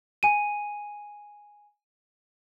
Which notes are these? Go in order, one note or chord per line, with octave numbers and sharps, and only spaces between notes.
G#5 D#7